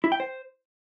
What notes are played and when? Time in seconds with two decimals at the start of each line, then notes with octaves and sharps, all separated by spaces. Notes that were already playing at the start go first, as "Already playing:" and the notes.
0.04 E4
0.12 G5
0.20 C5